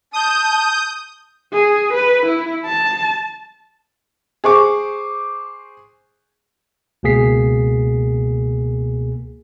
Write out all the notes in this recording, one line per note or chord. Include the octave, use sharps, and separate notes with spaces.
A5 D#6 G6
G#4
B4
E4
A5
G#4 C5 C#6 D6
C#2 B2 A#3 G#4 B6 C7